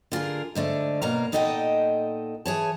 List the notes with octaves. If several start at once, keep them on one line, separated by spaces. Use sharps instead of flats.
D3 F4 G#4 A#4
G#2 D3 A3 D5
B2 A#3 C#5 F5 A#5
A#2 D#4 A4 D#5 F#5 G5
E3 G#4 C#5 A5